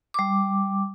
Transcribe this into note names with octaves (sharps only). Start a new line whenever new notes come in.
G3 D6